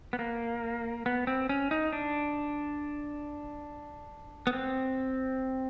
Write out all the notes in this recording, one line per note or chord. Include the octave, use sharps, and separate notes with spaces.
B3
A#3
B3
C4
C#4
D#4
D4
B3
C4